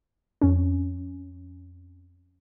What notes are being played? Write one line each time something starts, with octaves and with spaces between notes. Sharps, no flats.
F2 C#4